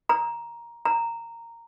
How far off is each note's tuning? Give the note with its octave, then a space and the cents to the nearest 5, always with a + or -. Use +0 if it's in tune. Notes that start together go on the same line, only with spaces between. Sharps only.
A#5 +10
A#5 -10